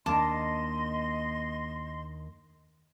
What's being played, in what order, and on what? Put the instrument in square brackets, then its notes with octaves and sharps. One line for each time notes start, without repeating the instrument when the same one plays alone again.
[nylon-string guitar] D#2 A#3 D4 [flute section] D#5 C6 [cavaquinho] A5 D6